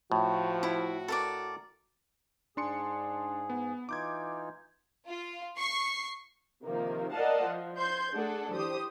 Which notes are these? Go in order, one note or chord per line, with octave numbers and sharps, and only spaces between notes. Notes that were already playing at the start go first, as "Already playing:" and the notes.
A2 F3 F#4
E4
A4 A#4 D5
G#2 D4 G#4 C6 C#7
B3
E3 D#4 F4 D6 G6 G#6
F4
C#6 C7
C3 D#3 F3 A#3
A#4 D5 D#5 F5 F#5 A5
F3
C5 C6 G6 G#6
A3 D4 G#4 A4 D5 F#5
E3 G4 C5 D#6